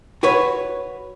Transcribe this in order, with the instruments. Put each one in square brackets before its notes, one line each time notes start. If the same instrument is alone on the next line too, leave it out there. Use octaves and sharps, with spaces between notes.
[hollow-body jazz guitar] F#4 B4 C#5